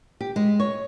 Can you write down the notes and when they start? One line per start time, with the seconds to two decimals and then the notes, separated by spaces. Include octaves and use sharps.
0.21 G4
0.36 G#3
0.60 C#5